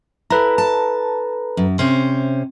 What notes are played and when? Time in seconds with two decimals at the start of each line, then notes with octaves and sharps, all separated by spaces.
0.30 E4 A4 B4 A#5
0.58 A5
1.57 F#2
1.79 C3 C#4 C5